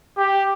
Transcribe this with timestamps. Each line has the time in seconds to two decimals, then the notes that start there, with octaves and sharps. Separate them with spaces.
0.18 G4